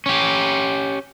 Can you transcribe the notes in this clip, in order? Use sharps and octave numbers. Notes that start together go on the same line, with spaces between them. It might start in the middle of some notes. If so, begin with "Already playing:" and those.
C#4 G4